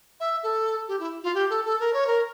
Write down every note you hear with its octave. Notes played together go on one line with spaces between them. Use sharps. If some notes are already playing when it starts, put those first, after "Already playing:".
E5
A4
G4
E4
F4
G4
A4
A4
A#4
C#5
A#4